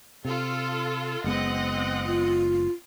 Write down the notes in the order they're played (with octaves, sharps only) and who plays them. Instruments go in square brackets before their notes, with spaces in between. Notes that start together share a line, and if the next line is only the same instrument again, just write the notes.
[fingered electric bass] C3 [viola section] F4 A4
[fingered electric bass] F#1 G#3 B3 [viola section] C4 D#5 F#5
[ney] F4